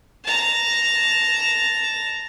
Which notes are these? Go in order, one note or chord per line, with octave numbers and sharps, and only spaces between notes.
A5 A#5